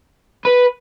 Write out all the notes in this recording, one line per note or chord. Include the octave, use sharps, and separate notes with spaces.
B4